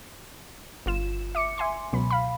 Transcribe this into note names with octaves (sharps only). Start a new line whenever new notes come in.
G1 F4 E7
E5 D6 C#7
E5 G#5 C6
C#2 B2 F#3 B5
F5 B5